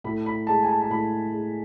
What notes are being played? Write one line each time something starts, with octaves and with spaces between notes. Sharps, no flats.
A2 B5
B5
G#3 A5
G#5
A5
A5
A2 B5
G#3